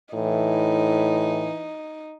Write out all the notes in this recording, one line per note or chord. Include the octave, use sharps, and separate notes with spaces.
A2 E3 D#4